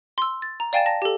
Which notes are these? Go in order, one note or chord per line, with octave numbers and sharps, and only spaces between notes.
C6 E6
A6
A#5
D5 F5 G5 G#5 A6 E7
A5 A#6
G4 A4